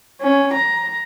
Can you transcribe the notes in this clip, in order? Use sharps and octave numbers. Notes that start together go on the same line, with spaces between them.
C#4
A#5